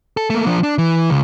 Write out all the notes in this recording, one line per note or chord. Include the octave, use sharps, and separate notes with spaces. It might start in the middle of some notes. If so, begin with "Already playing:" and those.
A4
A3 A#3
F3 D4
D4
E3
C#2